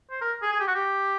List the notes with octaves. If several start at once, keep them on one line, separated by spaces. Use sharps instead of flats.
C5
A#4
G#4
G#4
G4
F#4
G4